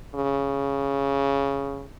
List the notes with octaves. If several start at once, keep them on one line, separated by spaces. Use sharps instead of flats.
C#3